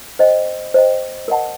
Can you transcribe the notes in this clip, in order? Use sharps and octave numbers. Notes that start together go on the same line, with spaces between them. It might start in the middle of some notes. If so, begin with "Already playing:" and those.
C5 D#5 G5
C5 D#5 G5
A#4 D#5 F#5 A5